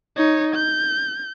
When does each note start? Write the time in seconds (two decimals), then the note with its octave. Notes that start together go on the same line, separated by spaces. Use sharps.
0.16 D#4 C#5
0.55 G6